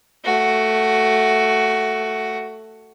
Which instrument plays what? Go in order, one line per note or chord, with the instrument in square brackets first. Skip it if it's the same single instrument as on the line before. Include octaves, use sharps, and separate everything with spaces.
[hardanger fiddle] A3 F#4